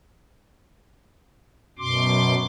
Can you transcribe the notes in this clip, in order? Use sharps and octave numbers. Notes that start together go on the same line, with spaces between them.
F#2 B2 C6 D6